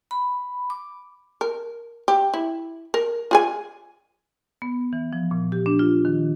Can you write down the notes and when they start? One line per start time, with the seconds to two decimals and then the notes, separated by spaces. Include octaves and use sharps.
0.11 B5
0.70 D6
1.41 A#4
2.08 G4
2.34 E4
2.94 A#4
3.31 F4 G#4 G#5
4.62 B3
4.93 E3
5.13 F3
5.31 A#2
5.52 G4
5.66 D4
5.79 F4
6.05 D#3